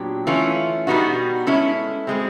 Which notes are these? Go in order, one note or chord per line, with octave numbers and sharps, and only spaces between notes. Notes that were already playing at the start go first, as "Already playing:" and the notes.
Already playing: A#2 F#3 B3 D4 G4
E3 A3 C#4 F4
B2 G3 B3 D#4 F#4
G#3 C#4 E4 A4
B2 G#3 C4